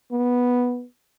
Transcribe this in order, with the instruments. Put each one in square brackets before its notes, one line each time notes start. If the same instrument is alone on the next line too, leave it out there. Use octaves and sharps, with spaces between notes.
[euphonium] B3